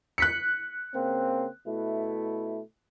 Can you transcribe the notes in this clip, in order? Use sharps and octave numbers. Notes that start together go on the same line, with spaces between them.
F#6 B6 C#7
C#3 A#3 C4
B2 A3 E4